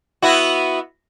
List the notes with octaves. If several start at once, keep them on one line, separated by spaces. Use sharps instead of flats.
B3 E4 F#4